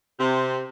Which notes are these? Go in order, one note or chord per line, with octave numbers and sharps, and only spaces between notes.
C3